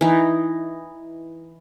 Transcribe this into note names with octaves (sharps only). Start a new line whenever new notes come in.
E3 D#4